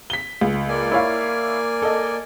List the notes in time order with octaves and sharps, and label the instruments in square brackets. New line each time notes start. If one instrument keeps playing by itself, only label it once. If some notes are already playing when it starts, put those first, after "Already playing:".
[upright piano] B6 G7
C#2
[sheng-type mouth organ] A#3 D5 G#5
[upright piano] E4 C#5 F5
A4 D#5